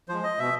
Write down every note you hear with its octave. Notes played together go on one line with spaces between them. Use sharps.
F3 G#3 C5
D#5
B2 E5